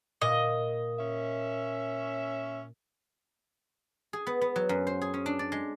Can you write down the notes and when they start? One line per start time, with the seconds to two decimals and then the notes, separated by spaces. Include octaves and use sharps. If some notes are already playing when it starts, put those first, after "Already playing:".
0.21 A#2 D#5
0.99 C#4 E5
4.13 G#4
4.27 B3
4.41 B3
4.56 F#3
4.69 F#2
4.87 C5
5.01 G#4
5.14 C#4
5.26 D4
5.39 D5
5.52 G#3